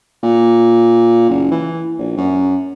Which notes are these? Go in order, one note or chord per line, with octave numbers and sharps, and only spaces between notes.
A#2
F#1
E3
A#1
F#2